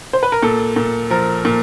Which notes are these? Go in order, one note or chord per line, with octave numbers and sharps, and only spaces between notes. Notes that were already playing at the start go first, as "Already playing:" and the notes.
C5
B4
A#4
A#2 A4
A#2
F3 A#4
A#2